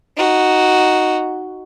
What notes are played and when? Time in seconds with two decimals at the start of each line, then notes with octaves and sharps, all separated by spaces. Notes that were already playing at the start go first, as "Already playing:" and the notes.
0.17 D#4 F#4